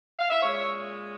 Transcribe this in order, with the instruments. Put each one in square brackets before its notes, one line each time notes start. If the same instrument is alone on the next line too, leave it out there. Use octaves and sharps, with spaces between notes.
[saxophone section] F5
E5
A#2 G#3 C#4 C#5